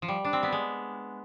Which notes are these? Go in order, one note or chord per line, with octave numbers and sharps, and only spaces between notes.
F3
G3
D4
C4
B3
G#3